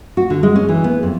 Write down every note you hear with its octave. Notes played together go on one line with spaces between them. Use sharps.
F#4
D3
G#3
C#4
E3
B3
F2